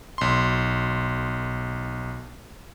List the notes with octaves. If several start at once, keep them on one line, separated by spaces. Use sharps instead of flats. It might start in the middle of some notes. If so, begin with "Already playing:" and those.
B1 C6